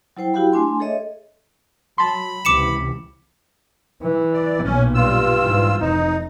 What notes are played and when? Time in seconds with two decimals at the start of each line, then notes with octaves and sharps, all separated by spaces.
0.17 F#3 E4 C5 G5
0.34 E4 F#4 G4 F5 G5 B5
0.52 A3 D4 G#5 C6
0.79 G#4 A4 C#5 D#5 E5
1.98 F#3 A5 B5 C6
2.45 C#2 C3 E3 D6 C#7 E7
4.02 E3
4.33 D5
4.64 B1 A#2 C#4
4.95 G2 F4 E6
5.40 G#2 E3
5.81 F1 D#4